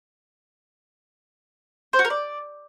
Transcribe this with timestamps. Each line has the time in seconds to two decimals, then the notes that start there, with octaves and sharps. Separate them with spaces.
1.93 C5
1.99 F#4
2.05 A#4
2.10 D5